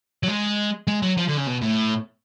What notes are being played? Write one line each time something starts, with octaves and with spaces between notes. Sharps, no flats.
F#3
G#3
G#3
F#3
F3
D3
C#3
B2
A2